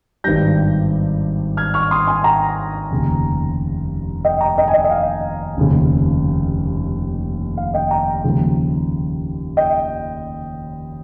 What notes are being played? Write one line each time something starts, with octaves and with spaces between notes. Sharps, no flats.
G#1 G2 D#3 G3 G6 A#6
F6 G#6
C#6 F6
C6 D#6
G#5 C6
G5 A#5
F1 D#2 C#3
D#5 G5
G5 A#5
D#5 G5
G#5
D#5 G5
D#5
F5
F1 D#2 C#3
F5
D#5 G5
G5 A#5
D#2 C#3 F3 G#3
D#5 G5